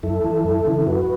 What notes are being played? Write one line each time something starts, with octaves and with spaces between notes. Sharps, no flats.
F#2 E4 A4
E3
F#2
C#3 E3
A4
F#2 F#4 B4